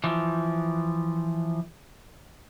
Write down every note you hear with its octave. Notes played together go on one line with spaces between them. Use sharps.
E3 F3